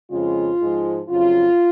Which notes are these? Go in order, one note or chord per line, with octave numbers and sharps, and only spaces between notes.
F2 C#3 F3 G#3 F4
G#2 F3 G#3
F2 C#3 F#3 F4